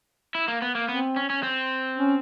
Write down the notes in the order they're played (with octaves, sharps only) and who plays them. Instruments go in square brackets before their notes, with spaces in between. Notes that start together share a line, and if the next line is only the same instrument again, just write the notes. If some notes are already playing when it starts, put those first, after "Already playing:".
[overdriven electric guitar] E4
A#3
B3
A#3
[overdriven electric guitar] B3 [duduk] C4
[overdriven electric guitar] C#4
C#4
C4
[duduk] C#4